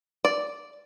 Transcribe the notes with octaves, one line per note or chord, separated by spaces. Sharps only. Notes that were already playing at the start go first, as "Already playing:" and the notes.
D5